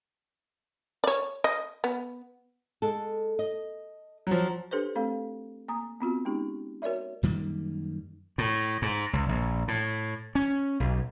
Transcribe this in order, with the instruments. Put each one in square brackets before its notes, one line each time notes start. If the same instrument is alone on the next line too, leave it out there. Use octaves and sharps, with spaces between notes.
[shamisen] C#5 D5
D#5
B3
[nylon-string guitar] G#3 A4
D#5
[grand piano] F3 F#3
[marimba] D4 G4 A4 B4 C5
A3 C4 A4 F5
A#3 A#5 D#6
B3 C4 F4 F#4
G#3 C#4 D#4 G4
F#4 A#4 C#5 D5 E5
[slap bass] F#2 D#3 G3 A#3
A2
G#2
C#2
A#1
A2
C#4
B1